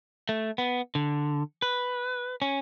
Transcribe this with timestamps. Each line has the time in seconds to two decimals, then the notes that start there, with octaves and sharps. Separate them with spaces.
0.29 A3
0.58 B3
0.95 D3
1.62 B4
2.42 C#4